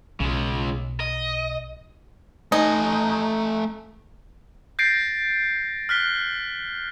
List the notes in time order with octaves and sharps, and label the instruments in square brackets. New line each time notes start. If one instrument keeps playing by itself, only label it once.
[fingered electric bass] B1 [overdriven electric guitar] C#3 G#3
[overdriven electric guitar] D#5
[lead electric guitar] A3 G#5 [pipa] D#4
[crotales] G6 A6 A#6 C7 D7
F6 F#6 B6 G7